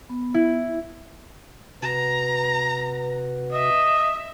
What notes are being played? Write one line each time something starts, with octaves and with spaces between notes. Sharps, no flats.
B3
E4
C3 F#4 B4 A#5
D#5 E5